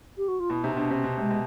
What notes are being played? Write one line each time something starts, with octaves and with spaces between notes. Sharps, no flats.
G4
F#4
F4
B2 E4
C3 D#4
B2 D4
C3 C#4
B2
C3 G#3
B2